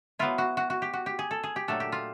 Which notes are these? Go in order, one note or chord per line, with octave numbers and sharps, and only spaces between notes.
F#3 B3 E4 F4
F#4
F#4
F#4
G4
F#4
G4
G#4
A4
G#4
G4
A#2 F#3 A3 D4 A4
G4
F4